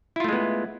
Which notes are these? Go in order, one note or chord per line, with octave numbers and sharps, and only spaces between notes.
G#3 A3 B3 E4 F4